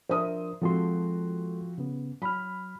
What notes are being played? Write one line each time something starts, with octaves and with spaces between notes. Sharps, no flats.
F3 D4 A#4 C5 E5 D#6
F3 G#3 C4 F#4 A4 C6
C#3 B3
F#3 B5 F6